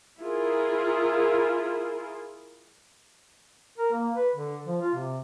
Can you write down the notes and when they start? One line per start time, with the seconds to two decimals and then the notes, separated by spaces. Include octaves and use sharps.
0.20 E4 F4 G#4 A#4
3.78 A#4
3.92 A#3
4.16 B4
4.36 D3
4.67 F3
4.82 F4
4.94 C3